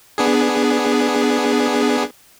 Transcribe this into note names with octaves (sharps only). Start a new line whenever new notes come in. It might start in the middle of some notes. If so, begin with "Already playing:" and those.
B3 D4 G#4